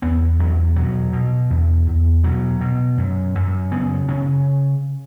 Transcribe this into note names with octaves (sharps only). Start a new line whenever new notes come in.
E2 B3
E2 F#3
B2 F#3
B2
E2
E2
B2 F#3
B2
F#2
F#2
C#3 B3
C#3 C#4